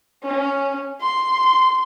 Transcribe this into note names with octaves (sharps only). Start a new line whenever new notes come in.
C#4
C6